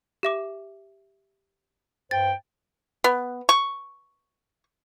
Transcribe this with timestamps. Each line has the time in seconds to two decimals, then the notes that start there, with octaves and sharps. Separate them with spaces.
0.23 G4 E5 D6
2.11 G2 C5 G5 A6
3.04 B3
3.49 C#6